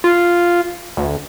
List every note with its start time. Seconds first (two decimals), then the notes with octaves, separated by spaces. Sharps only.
0.04 F4
0.97 D2